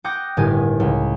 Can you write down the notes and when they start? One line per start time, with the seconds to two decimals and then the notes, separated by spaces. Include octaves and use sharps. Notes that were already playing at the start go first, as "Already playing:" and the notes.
0.04 F#5 G5 D6 D#6 G6 A#6
0.37 G1 A2 D#3 G4 G#5
0.80 C#2